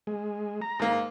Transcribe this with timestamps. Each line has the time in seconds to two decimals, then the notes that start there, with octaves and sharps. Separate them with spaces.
0.07 G#3
0.62 A#5
0.79 G#2 A#3